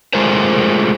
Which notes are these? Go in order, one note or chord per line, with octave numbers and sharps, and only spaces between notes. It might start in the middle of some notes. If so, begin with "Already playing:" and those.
G#3 A3 F4 G#4 A#4 C5